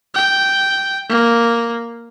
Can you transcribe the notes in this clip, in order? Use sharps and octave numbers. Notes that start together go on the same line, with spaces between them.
G5
A#3